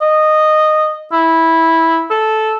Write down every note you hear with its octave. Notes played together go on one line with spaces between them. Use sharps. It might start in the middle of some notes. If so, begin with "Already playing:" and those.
D#5
E4
A4